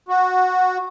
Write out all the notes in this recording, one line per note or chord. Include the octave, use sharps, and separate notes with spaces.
F#4